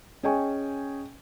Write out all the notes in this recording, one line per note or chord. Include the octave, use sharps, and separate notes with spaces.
C#4 G#4 D#5 G5 G#5 C#6